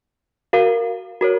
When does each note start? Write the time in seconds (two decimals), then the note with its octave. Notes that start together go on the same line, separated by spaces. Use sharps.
0.53 F#4 A#4 F5
1.21 F#4 A#4 C#5